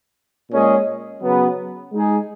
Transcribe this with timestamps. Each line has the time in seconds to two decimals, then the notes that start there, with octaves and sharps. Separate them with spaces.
0.51 A#2 G#3 C#4 G#4 D#5
1.22 C#3 F#3 B3
1.93 G#3 D#4 G#4